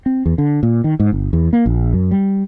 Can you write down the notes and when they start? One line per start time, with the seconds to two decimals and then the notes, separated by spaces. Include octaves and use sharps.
0.06 C4
0.26 E2
0.38 D3
0.63 A#2
0.84 D#3
1.00 G#2
1.12 G1
1.33 E2
1.53 A#3
1.66 A#1
1.93 F#2
2.11 G3